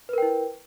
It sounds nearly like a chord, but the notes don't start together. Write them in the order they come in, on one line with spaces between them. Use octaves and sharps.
B4 A#4 G5 E4